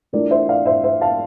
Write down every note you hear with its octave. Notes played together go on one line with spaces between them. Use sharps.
E3 A3 D4 F4 A#4 D5
C5 E5
D5 F5
C5 E5
C5 E5
F5 A5